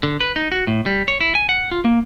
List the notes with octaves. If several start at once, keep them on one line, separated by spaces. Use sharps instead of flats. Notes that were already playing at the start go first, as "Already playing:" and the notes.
D3
B4
D#4
F#4
A2
G3
C#5
E4
G#5
F#5
F4
A#3